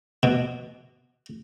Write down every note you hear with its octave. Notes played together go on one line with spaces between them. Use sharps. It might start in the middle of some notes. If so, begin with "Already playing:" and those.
B2